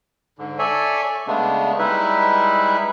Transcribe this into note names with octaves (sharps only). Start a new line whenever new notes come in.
G#2 D3
A4 C#5 D5 E5 G#5
C#3 G#3 A3 B3 D4
G3 G#3 D#4 E4 B4 E5